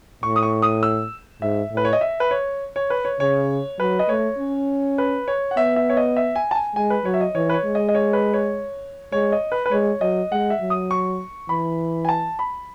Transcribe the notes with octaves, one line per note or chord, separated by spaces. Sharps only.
A2 C#6
D#6
C#6
D#6
E6
G#2 E5
A2
B4
C#5
D#5
E5
B4
C#5
C#5
B4
C#5
C#3 C#5
F#3 B4
D#5
A3 C#5
C#4
B4
C#5
F#5
B3 E5
E5
C#5
D#5
E5
G#5
A5
G#5
G#3 G#5
B4
F#3 C#5
E5
D#5
E3 C#5
B4
C#5
G#3
D#5
D#5
C#5
B4
C#5
G#3 C#5
D#5
B4
B4
G#3 C#5
F#3 D#5
G#3 F#5
E5
F#3
D#6
C#6
E3 B5
G#5
A5
B5